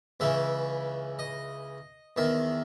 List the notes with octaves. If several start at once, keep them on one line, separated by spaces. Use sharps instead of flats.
C#2 C#3 E3 E5
D#5
E2 D#3 E5